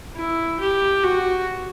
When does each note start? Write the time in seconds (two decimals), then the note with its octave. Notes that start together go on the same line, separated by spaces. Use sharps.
0.16 E4
0.61 G4
1.03 F#4